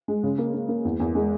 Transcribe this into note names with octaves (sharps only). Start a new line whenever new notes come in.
G#3
C#3
A#3
A#3
A#3
E2
E2
G#3